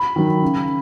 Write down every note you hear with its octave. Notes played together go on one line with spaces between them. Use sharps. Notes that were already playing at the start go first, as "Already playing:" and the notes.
Already playing: B5
D#3 F#3
C#3